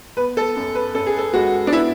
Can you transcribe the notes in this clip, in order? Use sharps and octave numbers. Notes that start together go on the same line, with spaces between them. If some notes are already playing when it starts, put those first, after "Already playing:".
B3 B4
A4
F#2
B4
F#2 A4
G#4
A4
G#3 F#4
D4
B3 E4